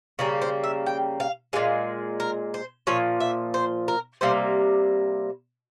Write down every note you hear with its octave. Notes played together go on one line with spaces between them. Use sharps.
C#3 G3 A#3 G#4
C5
E5
G5
F5
A#2 F3 G#3 F5
A#4
C5
A#2 F3 C#5
E5
C5
A#4
C3 G3 A#3 C5